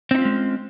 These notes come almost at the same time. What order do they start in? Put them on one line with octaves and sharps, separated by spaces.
C4 D#4 F4 C#4 G#3